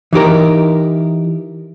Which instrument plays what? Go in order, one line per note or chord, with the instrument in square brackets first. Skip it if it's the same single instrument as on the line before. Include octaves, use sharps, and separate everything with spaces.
[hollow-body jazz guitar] E3 D#4 G4 A#4